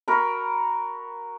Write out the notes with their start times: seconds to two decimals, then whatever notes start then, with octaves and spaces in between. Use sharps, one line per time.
0.08 F#4 A#4 B5